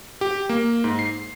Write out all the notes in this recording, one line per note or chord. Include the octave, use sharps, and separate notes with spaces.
G4
A#3
G#2
C7